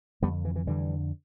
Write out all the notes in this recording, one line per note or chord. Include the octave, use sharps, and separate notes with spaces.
F2 D3 G3 B3
E3
E3
F2 D3 E3 G3